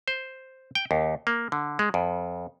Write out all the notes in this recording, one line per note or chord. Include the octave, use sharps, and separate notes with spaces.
C5
G5
D#2
A#3
D3
G#3
F2